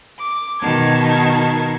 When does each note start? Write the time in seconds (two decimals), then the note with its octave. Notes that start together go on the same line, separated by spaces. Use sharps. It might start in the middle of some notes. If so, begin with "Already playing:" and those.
0.18 D6
0.62 B2 D#3 D#4 A5 G#6